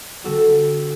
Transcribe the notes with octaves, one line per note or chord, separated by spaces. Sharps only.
D3 G3 B3 F#4 A4